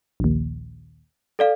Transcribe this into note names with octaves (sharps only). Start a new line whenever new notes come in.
A#1 D#2
A4 D5 F5